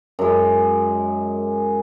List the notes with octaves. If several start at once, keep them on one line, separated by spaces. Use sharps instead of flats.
F#2 G#3